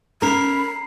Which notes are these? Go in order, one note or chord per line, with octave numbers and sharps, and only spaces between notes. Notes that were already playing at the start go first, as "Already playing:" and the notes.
C#4 A#4 A#5 B5 C7